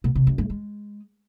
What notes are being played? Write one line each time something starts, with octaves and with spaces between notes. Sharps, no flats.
B2
C3
F#2
G2
G#3